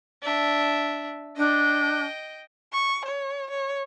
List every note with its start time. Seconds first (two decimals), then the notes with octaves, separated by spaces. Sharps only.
0.22 D4 E5
1.37 D4 D#5 G5
2.73 C#6
3.06 C#5
3.51 C#5